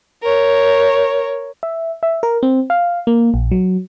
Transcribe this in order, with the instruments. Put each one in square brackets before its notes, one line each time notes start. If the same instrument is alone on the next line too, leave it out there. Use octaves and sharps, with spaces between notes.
[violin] A#4 C#5
[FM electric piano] E5
E5
A#4
C4
F5
A#3
A#1
F#3